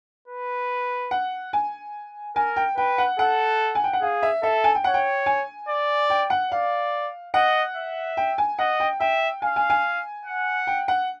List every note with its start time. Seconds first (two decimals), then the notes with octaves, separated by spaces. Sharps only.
0.28 B4
1.11 F#5
1.53 G#5
2.36 A#4 G#5
2.56 G5
2.77 B4 G5
2.98 F#5
3.18 A4 F#5
3.75 G#5
3.84 G5
3.93 F#5
4.01 G#4 F5
4.23 E5
4.43 A4 E5
4.64 G#5
4.75 G5
4.84 C#5 F#5
4.94 G5
5.26 G#5
5.69 D5
6.10 G5
6.30 F#5
6.52 D5 F5
7.34 D#5 F#5
7.76 E5
8.17 G5
8.38 G#5
8.59 D#5 F#5
8.80 G5
9.00 E5 G5
9.42 F5 G#5
9.56 G#5
9.70 G#5
10.25 F#5
10.67 G5
10.88 F#5